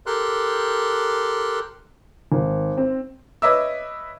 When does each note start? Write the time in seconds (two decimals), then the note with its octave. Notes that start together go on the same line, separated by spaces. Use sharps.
0.06 G4 A4 A#4 C6 F#6
2.32 G#1
2.77 C4
3.42 B4 C#5 D#5 E5 D6 E6